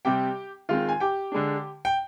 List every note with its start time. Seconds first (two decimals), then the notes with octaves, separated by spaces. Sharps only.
0.05 C3 G3 C4 G4 G5
0.69 D#3 G#3 C4 F4 F5
0.89 G#5
1.00 G4 G5
1.32 D3 G#3 D4
1.85 G5